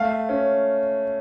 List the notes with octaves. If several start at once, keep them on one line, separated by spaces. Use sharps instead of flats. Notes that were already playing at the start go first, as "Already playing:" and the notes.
Already playing: A3 F5
C#4